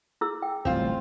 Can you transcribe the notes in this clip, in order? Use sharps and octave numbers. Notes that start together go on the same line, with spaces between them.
E4 G#4 E6
G5
D1 A1 G3 C4 F4